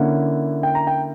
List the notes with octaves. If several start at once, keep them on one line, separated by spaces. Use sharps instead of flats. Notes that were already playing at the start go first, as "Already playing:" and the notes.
Already playing: D3 A#3 C#4 E4 F#5
G5
A#5
G5